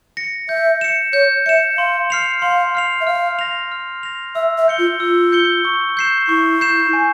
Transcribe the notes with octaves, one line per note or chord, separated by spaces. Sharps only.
A#6 C#7
E5 G6
C#7 E7
C#5 G6
E5 C#7 E7
F5 C6
F6 C7 F7
F5 C6
F6 C7 F7
E5
F5 F6
A#6 F7
F6
A#6 F7
E5 E6
E5
G6 C#7 G7
F4
F4 E6
G6 C#7 G7
C#6
G6 C7 E7
E4 C#6
G6 C7 E7
G#5